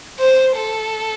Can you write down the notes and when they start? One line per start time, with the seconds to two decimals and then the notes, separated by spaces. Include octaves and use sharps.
0.19 C5
0.56 A4